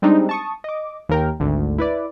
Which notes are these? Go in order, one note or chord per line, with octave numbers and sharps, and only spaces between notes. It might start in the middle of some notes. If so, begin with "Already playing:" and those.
G3 G#3 C4 D4 D#4
A5 C#6 D#6
D#5 D6
D#2 A#4 G5
G#1 D2
E4 B4 D5